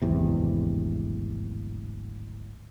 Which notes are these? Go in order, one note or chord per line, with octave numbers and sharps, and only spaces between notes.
D1 G#1 E2 C3